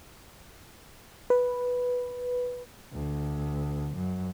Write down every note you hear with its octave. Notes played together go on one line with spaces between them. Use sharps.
B4
D2
F#2